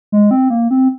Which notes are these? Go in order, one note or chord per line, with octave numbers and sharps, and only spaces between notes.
G#3
C4
A#3
C4